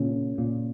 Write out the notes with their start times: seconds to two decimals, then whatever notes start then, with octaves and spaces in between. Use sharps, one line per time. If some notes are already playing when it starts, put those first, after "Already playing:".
Already playing: A#2 C#3 C#4
0.38 A#2